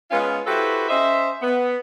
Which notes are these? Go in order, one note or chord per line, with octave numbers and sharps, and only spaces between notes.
G#3 B3 C#4 F4
E4 F#4 G4 A4 B4 C5
C#4 C5 D#5 E5
B3